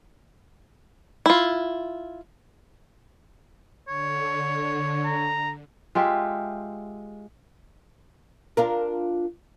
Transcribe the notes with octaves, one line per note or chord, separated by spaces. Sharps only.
E4 F4
D3 C#5
A#5
G#3 F4 G4 E5
D4 F4 A#4